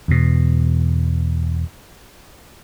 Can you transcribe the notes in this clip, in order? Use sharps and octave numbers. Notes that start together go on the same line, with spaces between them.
E2 B2